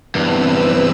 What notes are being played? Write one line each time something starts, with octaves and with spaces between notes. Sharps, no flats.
E2 G2 C4 B4 E6